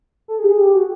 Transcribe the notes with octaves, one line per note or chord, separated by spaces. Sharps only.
A4
G#4
G4
G#4
G4
F#4